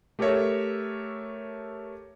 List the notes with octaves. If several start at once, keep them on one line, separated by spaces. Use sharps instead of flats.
A3 G4 A4 A#4 C#5 E5